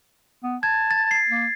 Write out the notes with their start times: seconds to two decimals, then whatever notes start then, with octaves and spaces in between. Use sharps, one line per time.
0.43 B3
0.63 A5 G#6
0.91 A6
1.11 C7
1.29 A#3